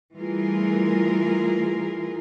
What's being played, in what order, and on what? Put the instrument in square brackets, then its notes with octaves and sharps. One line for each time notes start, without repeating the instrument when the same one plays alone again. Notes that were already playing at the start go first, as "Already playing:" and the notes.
[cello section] E3 G3 A3 F4 G#4 A#4